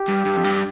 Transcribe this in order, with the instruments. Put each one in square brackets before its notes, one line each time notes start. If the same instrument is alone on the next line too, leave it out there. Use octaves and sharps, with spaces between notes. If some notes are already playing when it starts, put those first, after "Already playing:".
Already playing: [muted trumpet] G4
[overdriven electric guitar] G2
G2
F2
G2